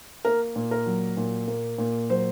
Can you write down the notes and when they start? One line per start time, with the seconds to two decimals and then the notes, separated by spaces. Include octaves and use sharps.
0.25 A#3 A#4
0.56 A#2
0.71 A#4
0.86 F#3
1.17 A#2
1.48 A#3
1.78 A#2
2.09 F#3 C5